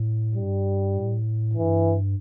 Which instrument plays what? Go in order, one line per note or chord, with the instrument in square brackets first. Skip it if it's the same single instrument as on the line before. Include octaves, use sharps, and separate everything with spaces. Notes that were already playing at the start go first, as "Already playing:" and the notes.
Already playing: [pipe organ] A2
[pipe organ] G2 [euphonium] G3
[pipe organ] A2
[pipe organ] G2 [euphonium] E3